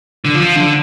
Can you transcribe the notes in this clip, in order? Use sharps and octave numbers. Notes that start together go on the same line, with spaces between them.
D3
F3
D3